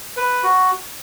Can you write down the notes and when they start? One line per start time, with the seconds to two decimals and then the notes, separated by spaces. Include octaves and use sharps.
0.17 B4
0.43 F#4